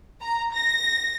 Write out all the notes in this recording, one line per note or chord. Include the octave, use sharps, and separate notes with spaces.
A#5
A#6